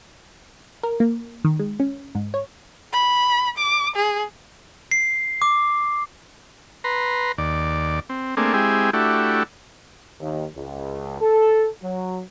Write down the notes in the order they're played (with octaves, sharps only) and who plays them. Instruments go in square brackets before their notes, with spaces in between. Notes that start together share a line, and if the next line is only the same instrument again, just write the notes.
[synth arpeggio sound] A#4
A#3
D#3
G#3
C#4
G#2
C#5
[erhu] B5
D6
G#4
[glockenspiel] C7
D6
[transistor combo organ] B4 A#5 C6
D#2 D5
C4
A3 A#3 C4 D4 G#4
G#3 C4 E4 G4 G#4
A3 D4 E4 F#4 G4
[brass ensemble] D#2
C#2
A4
F#3